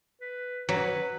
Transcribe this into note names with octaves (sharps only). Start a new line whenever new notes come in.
B4
F#3 B4